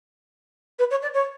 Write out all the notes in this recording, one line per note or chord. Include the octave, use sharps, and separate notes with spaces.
B4
C#5
D5
C#5